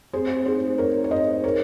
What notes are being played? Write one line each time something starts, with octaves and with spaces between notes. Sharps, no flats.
C4 G#4 C5
D#4 G#4 C5
D#4 A#4 C#5
C#5
G#4 C5 D#5
D#4 A#4 C#5